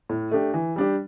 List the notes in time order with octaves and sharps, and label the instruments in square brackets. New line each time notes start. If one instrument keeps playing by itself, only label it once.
[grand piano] A2
A3 D4 G4
E3
G3 D4 G4